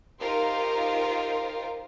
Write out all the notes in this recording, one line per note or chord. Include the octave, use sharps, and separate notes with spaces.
D#4 F4 G4 A#4 C5